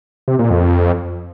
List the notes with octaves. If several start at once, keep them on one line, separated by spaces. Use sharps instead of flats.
C3
A#2
F2